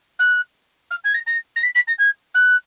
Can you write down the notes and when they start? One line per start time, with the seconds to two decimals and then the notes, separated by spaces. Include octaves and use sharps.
0.19 F#6
0.91 F6
1.04 G#6
1.14 A#6
1.27 A#6
1.56 A#6
1.63 B6
1.75 B6
1.88 A#6
1.99 G#6
2.35 F#6